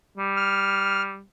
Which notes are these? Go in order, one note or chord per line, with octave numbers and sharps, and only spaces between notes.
G3
F6